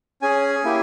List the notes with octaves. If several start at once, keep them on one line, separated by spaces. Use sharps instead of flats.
C#4 G#4 G#5
A#3 E4 G4